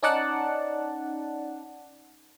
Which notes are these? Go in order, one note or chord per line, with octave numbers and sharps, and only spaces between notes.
C#4 D#4 D5 F#5 A5